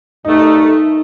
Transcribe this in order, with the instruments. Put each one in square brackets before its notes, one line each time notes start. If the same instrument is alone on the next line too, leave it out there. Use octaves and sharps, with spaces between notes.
[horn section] G2 D#3 A3 [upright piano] D#4